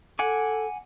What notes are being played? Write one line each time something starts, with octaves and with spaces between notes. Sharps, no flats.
A4 F#5 G#5 D6